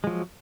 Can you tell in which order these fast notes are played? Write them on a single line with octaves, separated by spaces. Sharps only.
G#3 F3 F#3